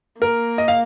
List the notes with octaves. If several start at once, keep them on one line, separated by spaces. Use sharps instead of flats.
A#3 A#4
D#5
F5